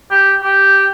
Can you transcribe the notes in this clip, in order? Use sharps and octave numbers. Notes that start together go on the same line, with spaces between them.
G4
G4